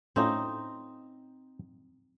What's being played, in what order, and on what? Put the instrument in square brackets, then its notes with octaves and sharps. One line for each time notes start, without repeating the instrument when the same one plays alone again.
[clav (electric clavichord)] A2 A3 C#4 F4 [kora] C4 D#4